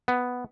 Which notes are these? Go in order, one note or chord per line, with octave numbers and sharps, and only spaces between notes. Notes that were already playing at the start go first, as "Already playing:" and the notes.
B3